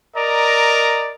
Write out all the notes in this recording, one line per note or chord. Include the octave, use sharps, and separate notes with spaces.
A#4 D5 D#5 A#5